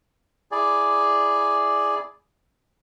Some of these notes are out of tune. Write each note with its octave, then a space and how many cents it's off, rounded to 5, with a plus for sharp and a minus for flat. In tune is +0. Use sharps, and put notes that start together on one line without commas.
E4 +0 G#4 +0 D5 +0